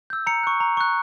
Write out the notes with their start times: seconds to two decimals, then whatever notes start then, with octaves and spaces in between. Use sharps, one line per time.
0.10 E6 G6
0.27 A#5 C#7
0.43 C#6 F#6
0.60 A#5
0.77 C#6 F#6